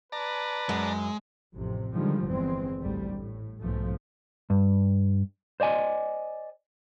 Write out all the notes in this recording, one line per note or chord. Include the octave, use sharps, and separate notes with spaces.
B4 D5 A5 A#5
F#2 G#3
A1 F2 C3
D3 D#3 F3 G3 G#3
G1 E2 G#3 C4
A1 D2 G3
A2
B1 G#2 F3 A3
G2
C5 D5 D#5 G#5